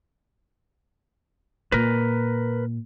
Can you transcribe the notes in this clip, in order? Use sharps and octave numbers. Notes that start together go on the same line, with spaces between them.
A#2 A#4 B4